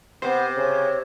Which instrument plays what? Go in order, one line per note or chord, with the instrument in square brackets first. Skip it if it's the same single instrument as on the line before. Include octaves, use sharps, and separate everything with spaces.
[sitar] C3 [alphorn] B3 [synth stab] C5
[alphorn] C#3 [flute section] C#5